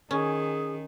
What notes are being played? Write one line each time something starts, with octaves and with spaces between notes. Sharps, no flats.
D#3 C#4 G#4